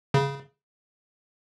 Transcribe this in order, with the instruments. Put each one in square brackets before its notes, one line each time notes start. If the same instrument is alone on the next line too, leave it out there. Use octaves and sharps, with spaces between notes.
[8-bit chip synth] C#3